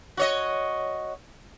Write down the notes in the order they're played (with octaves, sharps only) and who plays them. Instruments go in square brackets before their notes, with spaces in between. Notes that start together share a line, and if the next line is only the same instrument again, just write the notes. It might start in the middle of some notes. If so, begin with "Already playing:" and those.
[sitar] F#4 C#5 D#5